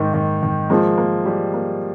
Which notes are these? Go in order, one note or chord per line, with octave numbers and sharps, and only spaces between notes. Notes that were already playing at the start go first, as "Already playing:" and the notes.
Already playing: G#2 D#3 A#3
D#3
D#3
F3 G#3 A#3
A#3
G3
A#3